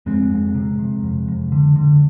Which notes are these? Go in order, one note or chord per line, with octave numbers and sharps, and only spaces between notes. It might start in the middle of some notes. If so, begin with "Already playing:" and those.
F2 G#3 C4
F2
C3
C3
F2
F2
D3
D3